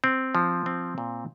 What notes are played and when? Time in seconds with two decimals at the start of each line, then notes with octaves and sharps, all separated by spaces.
0.04 C4
0.35 F3
0.66 C4
0.98 A#2